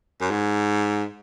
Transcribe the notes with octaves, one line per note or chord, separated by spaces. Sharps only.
F#2
G#2